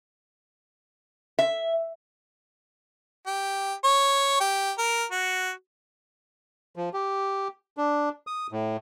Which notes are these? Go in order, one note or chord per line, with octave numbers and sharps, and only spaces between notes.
E5
G4
C#5
G4
A#4
F#4
F3
G4
D4
D#6
A2